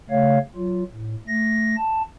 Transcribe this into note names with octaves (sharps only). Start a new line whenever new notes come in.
C#3 A3 C#5 F5
F#3 F4
A2
A3 A#6
A5